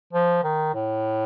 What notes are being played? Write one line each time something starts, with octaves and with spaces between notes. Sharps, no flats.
F3
D#3
A2